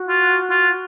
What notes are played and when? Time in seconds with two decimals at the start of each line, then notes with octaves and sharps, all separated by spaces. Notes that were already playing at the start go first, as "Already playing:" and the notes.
Already playing: F#4
0.08 F4
0.50 F4